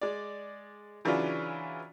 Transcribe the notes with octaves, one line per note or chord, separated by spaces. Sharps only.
G#3 D5
C#3 E3 F#3 C#4 D4 F4